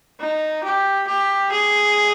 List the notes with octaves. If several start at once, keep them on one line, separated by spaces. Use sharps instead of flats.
D#4
G4
G4
G#4